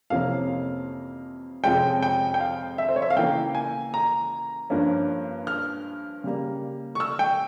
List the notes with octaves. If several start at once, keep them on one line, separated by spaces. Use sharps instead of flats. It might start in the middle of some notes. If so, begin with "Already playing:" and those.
F2 C3 E3 A#3 C#4 F5
F2 C3 F3 G#3 C#4 G5
G5
G5
F5
E5
C5
C#5
E5
F5
C#3 E3 A#3 G5
G#5
A#5
G2 F3 A#3 C#4
F6
C#3 G3 A#3
C#6
E6
G5